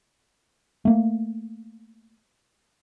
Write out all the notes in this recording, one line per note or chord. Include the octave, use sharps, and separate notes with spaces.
A3 A#3